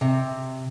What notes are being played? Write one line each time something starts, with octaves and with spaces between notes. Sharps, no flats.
C3